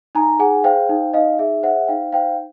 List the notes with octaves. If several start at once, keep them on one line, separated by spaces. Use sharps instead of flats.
D#4 G#5 A#5
G#4 F#5 G#5
C5 F5 G5
D#4
D#4 D#5 F5
G#4 E5
C5 E5 F#5
D#4 F5 G5
C5 F5 G5